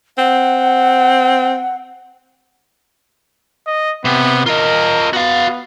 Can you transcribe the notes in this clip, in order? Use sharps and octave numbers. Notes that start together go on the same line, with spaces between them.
C4 F#5
D#5
C3 B3
F4 A#4 D#5
B3 F#4 F5